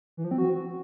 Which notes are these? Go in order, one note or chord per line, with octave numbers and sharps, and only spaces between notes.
E3
F3
C4
F#4